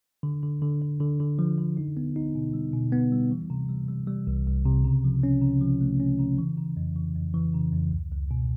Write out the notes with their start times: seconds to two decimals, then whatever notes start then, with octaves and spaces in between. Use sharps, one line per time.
0.23 D3
0.43 D3
0.62 D3
0.82 D3
1.00 D3
1.20 D3
1.39 F3
1.58 D3
1.77 D#4
1.97 B3
2.16 D#4
2.35 B2
2.53 G3
2.73 B2
2.92 B3
3.12 G3
3.31 E3
3.50 C3
3.69 G3
3.88 G3
4.07 G3
4.27 C2
4.47 C2
4.65 C3
4.84 C#3
5.04 F3
5.23 C#4
5.42 C#3
5.61 F3
5.81 A3
6.00 C#4
6.19 C#3
6.38 E3
6.58 C#3
6.77 F2
6.96 E3
7.15 F2
7.34 E3
7.54 C#3
7.73 F2
7.92 C#2
8.11 C#2
8.31 B2